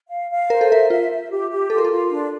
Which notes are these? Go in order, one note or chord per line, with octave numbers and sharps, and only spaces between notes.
F5
F5
A#4 C5
A4
A#4 E5
F4 E5
E5
G4
G4
F4 A4
A#4
A4
F4
D4